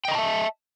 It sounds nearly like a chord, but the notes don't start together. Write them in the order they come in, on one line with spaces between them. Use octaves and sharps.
G5 D#5 A#5 A5 E5